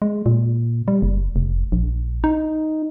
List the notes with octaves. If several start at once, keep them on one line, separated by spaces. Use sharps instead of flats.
G#3
A#2
G3
F#1
F1
A#1
D#4